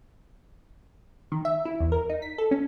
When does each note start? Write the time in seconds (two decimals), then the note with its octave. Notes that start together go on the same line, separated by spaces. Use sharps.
1.32 D#3
1.45 E5
1.65 E4
1.80 E2
1.92 A#4
2.10 D#4
2.22 B6
2.38 A4
2.51 C#4